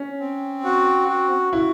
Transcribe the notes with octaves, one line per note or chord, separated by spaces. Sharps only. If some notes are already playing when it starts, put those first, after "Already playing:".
Already playing: C#4
C4
F#4
F#4
E4 F#4